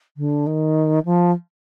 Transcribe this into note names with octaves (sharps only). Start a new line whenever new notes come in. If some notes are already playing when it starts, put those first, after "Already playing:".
D3
D#3
F3